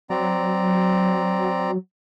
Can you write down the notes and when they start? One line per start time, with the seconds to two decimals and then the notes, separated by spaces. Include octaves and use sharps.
0.10 F#3 C4 D5 A#5